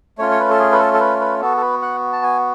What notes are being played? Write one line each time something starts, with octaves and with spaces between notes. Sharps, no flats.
A3 C#4 F4 C#5
C#5
B4
A4
G#4
B4
A4
A4
B4
B4
B3 F#4 A4
A4
B4
F#5
A5
G#5